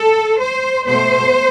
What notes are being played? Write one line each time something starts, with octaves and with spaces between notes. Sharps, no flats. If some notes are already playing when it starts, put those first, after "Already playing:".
Already playing: A4
C5
B2 A3 C5